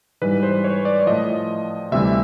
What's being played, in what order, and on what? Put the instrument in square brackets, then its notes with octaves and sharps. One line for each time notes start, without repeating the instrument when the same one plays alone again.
[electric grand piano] G#2 E3 G3 B4
C5
C#5
D5
D5
A2 F3 D#5
D2 C3 E3 G3 E5